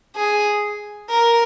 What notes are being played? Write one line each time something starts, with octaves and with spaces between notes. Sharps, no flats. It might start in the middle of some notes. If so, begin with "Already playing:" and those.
G#4
A#4